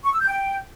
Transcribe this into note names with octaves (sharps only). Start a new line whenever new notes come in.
C#6
E6
G6
G5